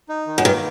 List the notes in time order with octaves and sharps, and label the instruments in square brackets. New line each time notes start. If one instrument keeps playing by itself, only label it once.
[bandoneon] D#4
D#3
[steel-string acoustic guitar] F#2
[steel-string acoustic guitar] G2 [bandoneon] A#3